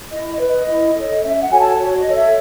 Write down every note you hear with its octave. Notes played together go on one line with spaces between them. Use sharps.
E4 D#5
D#5
B4
D#5
E4
A4 C#5
C#4 E5
F#5
F#4 A4 C#5 G#5
A5
F#4 C#5
C#5
D#5
A4 C#5
E5